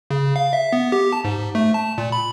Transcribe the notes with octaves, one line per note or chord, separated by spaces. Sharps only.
C#3
F5
E5
B3
G4
A5
G#2
A3
A5
A#2
B5